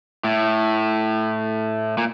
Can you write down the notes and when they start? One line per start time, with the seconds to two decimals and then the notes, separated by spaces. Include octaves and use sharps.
0.24 A2
1.98 A#2